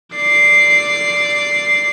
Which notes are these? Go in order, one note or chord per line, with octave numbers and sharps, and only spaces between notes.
D5 C7